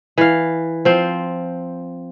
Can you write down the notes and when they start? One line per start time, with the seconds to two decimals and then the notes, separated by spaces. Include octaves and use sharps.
0.18 E3 F5
0.85 F3 C4